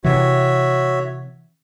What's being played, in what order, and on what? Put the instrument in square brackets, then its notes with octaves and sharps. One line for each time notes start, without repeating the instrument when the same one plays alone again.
[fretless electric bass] C3 E3 [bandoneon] F#4 C#5 E5